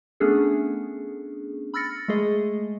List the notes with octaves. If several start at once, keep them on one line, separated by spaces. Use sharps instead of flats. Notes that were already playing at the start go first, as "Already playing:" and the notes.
A3 B3 C#4 D4 G#4 A4
B5 E6 F6 A6 A#6 C#7
G#3 A3 G#4 D#5